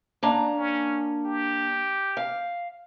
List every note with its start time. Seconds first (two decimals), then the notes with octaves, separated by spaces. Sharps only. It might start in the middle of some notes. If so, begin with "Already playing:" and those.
0.23 A#3 D4 A#5
0.58 C#4
1.26 G4
2.17 F5